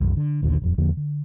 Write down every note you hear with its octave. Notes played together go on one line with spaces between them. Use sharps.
C2 F#2 E3
D3
A#1 D#2 A#2 D3
D#1 F2
E2 D3 F3 A#3
D3